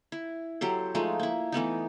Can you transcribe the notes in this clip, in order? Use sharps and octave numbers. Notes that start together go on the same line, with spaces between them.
E4
F#3 G4 A4 C5
F3 G#3 A3 D#4
A#3 E4
E3 A3 B3 D#4